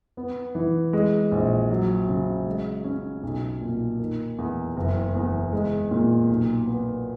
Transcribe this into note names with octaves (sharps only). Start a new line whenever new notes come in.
B3
E3
G#3
A#1
F#3
C#3
G#3
C#4
B1
A#2
D#3
E2
F#1
E2
G#3
A#2
B1
B3